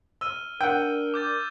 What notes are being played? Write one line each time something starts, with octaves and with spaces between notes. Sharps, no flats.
E6 F6 D#7 G7
D4 A#4 F#5 G5 E6
D6 G6 A6